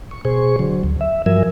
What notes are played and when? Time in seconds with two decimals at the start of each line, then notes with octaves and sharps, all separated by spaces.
0.11 C#6
0.25 B2 G#4 C5 C#6
0.59 D3 F#3
0.83 D2
1.01 E5
1.26 G2 F3 F#3 A#4 E5 G#5